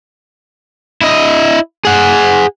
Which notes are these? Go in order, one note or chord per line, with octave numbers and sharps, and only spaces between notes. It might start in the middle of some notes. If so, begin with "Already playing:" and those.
E4 D#5
G#4 F#5